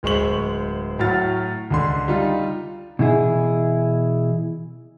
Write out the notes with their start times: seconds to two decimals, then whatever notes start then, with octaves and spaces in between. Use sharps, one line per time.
0.03 D1 G#3 C5 C#6 F#7
0.99 A2 F#3 F#4 F6 A6
1.70 C#2 D3 C6
2.08 G3 D#4 F4
2.99 B2 E3 E4 G#4